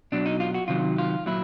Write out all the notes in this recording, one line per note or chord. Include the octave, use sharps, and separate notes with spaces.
B2 F#3 D4
D#4
F4
F#4
C3 D#3 F#3 F4
F4
A#2 F#3 E4